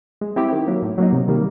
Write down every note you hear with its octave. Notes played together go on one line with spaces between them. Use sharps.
G#3
C4 E4 G4
D#3
F#3 A#3
A2
F#3 A#3 D#4
C3
D#3 G3 A#3